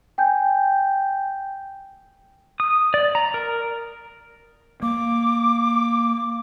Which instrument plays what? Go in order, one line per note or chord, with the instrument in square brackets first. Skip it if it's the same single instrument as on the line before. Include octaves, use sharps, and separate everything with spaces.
[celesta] G5 G#5 G6
[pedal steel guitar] D#6
D5
A#5
A#4
[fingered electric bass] A#3 [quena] D6